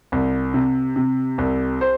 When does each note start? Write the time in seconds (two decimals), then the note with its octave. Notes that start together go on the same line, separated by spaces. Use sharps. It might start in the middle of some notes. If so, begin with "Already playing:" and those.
0.12 C2
0.54 C3
0.96 C3
1.38 C2
1.81 C5